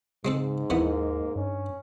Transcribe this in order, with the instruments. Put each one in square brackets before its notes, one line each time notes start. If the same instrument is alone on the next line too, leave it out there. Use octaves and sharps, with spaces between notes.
[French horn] G#2 [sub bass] C#3 [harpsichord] G#3 C4 A4
[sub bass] D#2 [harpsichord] D#3 E3 B3 [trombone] A#3
[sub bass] G2 [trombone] C#4